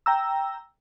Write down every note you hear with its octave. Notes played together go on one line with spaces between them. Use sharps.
G5 A#5 E6